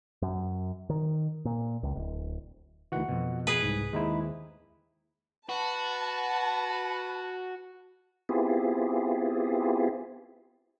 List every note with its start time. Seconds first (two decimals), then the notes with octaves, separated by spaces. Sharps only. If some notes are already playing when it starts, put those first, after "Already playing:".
0.22 F#2
0.90 D#3
1.45 A#2
1.83 C#2
1.95 D1
2.92 D2 D#3 E3 F#4 F#5
3.09 F2 B2
3.47 G#4 B4
3.62 C2 G#2
3.93 D#2 G#3 C4 D#4 E4
5.49 F#4 B4 A5
8.29 B3 C4 E4 F4 G4 G#4